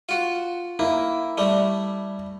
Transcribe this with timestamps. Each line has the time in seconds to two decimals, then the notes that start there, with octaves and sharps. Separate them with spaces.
0.09 F4 F#4
0.79 A#3 E4
1.38 G3 A3